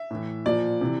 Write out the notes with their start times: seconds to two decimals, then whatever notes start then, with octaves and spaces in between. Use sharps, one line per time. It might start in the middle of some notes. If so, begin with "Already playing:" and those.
Already playing: E5
0.10 A2 E3
0.46 A#2 F3 D5
0.81 C3 E3